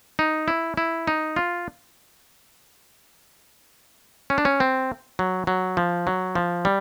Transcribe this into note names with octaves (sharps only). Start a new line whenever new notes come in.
D#4
E4
E4
D#4
F4
C#4
D4
C#4
C4
F#3
F#3
F3
F#3
F3
G3